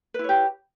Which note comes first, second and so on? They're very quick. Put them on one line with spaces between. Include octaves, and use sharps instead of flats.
B4 E4 C#5 G4